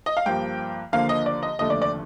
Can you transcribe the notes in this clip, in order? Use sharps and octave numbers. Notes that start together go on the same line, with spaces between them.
D#5
F5
G2 F3 A#3 G5
D#2 D3 F3 A#3 F5
D#5
D5
D#5
F1 D#2 D3 A3 D#5
D5
D5